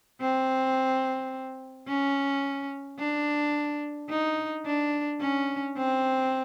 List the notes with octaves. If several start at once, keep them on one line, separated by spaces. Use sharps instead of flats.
C4
C#4
D4
D#4
D4
C#4
C4